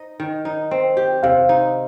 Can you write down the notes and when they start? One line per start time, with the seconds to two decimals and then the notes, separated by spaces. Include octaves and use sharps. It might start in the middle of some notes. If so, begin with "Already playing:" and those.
Already playing: D#4 C5 D#5
0.20 D#3
0.45 D#4
0.71 C4
0.97 G4
1.23 C3 F5
1.49 D#4